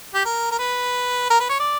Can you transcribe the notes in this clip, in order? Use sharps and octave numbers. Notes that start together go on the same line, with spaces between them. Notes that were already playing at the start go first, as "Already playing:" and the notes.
G4
A#4
A#4
B4
A#4
B4
C#5
D5